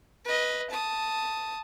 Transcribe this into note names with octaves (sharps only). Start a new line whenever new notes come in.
B4 D#5
A5 D#6